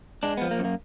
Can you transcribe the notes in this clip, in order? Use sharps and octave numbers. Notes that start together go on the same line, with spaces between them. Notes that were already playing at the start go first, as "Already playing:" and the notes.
G#3 D4
F3 B3
A#3
F#2
A#3